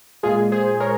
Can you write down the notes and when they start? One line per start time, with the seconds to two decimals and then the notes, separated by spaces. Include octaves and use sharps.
0.23 A#2 G#3 F4 G#4
0.52 G#4 C5
0.80 A#4 C#5